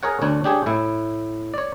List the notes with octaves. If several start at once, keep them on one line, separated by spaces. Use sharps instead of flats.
G#4 A#4 C#5 F#5
D2 D4 C#5
D4 G4 G#4 C#5
A2 E4
C#5 D5